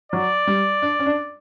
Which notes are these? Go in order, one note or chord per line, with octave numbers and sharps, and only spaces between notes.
F#3 D5
G3
D4
C#4
D4